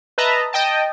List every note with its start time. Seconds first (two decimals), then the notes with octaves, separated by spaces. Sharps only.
0.18 B4 D#5 E5 A5 A#5
0.53 D#5 G5 A5